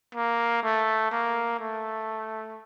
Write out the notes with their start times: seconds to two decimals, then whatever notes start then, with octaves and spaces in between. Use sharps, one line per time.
0.15 A#3
0.63 A3
1.12 A#3
1.60 A3